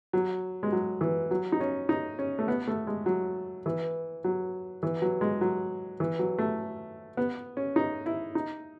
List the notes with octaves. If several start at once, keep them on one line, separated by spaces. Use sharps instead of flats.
F#3
G#3
F#3
E3
F#3
D#4
C#4
D#4
C#4
A3
B3
A3
G#3
F#3
E3
F#3
E3
F#3
G#3
F#3
E3
F#3
A3
B3
C#4
D#4
E4
D#4